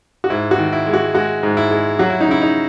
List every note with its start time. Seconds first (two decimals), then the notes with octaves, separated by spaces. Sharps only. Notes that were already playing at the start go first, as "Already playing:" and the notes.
0.24 F#4
0.30 G#2 E4
0.51 F#4
0.58 D#3
0.73 E4
0.86 G#3
0.94 F#4
1.15 G#3 F#4
1.43 G#2
1.57 E4
1.71 G#3
1.99 F#3 F#4
2.10 E4
2.21 D#4
2.28 C#3 E4
2.42 D#4